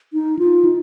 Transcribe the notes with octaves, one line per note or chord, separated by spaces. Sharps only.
D#4
F4
D#4